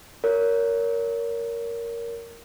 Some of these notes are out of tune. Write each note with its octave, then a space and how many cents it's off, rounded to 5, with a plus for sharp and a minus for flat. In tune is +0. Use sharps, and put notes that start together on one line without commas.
A#4 +0 C#5 +25